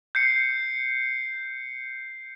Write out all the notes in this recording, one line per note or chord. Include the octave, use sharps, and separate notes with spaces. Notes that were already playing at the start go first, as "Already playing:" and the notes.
G6 C7 C#7